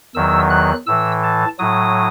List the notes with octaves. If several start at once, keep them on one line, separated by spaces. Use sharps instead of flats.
E2 D#3 F#3 E6
F#6
A2 E3 E6
A5
A2 F#3 D#6